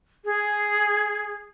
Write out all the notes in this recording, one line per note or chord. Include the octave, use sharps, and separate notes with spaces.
G#4